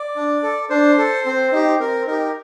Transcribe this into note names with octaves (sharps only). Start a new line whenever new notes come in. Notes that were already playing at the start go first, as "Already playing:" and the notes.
Already playing: D5
D4
A4
D4 C5
A4
C4
D#4 G4
C4 A#4
D#4 G4 A#4